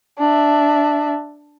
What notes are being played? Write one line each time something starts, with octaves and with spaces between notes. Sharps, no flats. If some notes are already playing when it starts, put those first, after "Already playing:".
D4 E5